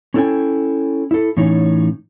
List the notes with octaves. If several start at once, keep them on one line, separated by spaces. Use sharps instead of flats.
C#4 E4 A4 C5 G5 G#5
E4 A4
A2 E3 C#4 D#4 C#5